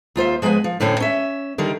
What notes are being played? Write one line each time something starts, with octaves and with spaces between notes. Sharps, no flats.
D#2 F4 C5 E5
F3 G#3 B3 G5 G#5
F3
F2 A2 D3 C4 C#4
C#4 E5
D3 D#3 G3 A#4